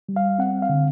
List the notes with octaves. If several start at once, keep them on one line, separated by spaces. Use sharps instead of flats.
G3
F5
C4 F#5
F5
D3